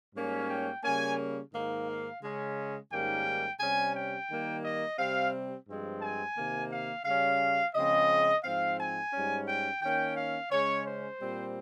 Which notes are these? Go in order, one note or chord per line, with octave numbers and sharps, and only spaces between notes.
G#2 G3 A#3 C#4
G5
C#3 G3 A#3 C#4 G#5
G#2 D#3 A#3
F5
C#3 G#3 C#4
G#2 D#3 G3 A#3 C#4 G5
C3 G3 C#4 G#5
G5
D#3 G3 A#3
D#5
C3 G3 C4 F5
G2 F3 G#3 C4
G#5
C3 D#3 A#3
F5
C#3 G3 C#4 F5
C#3 F3 G#3 C4 D#5
G#2 F3 C4 F5
G#5
G#2 G3 C#4
G5
D#3 A#3 C#4 G5
F5
C#3 G#3 C#4 C#5
C5
A#2 G3 C4